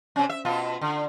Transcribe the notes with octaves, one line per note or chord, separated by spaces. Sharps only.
C3 C#4
E5
B2 F4
D3